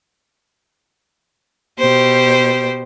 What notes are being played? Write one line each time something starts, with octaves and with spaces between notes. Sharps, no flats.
B2 G4 C5